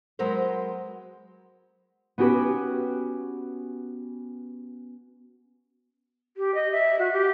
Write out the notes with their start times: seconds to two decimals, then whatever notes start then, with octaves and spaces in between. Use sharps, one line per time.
0.19 F#3 G#3 B3 A#4 C5
2.18 B3 C#4 F#4 G4 B4
6.37 G4
6.55 D#5
6.72 E5
6.99 F#4
7.13 G4